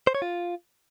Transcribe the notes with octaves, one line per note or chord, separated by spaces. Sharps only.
C5
C#5
F4